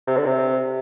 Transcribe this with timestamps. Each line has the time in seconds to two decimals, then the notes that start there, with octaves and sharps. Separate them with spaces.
0.07 C3
0.17 D3
0.26 C3